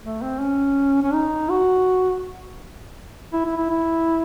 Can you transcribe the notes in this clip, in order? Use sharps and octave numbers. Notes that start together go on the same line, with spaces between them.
A3
C4
C#4
C#4
D#4
F#4
E4
E4
E4
E4